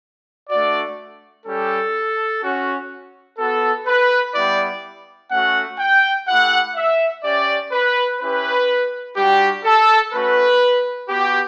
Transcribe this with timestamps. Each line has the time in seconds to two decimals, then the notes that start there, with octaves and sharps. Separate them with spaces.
0.50 A3 D4 F#4 D5
1.46 G3 C#4 G4 A4
2.43 C#4 F#4
3.39 B3 F#4 A4
3.87 B4
4.35 G3 B3 E4 G4 D5
5.31 A3 C#4 F#4 F#5
5.80 G5
6.28 A3 E4 G4 F#5
6.76 E5
7.24 C#4 G4 D5
7.72 B4
8.20 C#4 E4 G4 B4
9.17 G3 D4 F#4 G4
9.65 A4
10.13 A3 C#4 F#4 B4
11.09 B3 F#4 G4